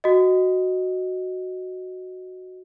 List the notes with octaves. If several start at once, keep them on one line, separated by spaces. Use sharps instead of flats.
F#4 D#5